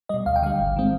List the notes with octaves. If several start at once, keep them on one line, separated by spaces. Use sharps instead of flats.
B2 G3 D#5
D2 F5
G5
D3 G3 F5
G#1
D#3 G#3 C4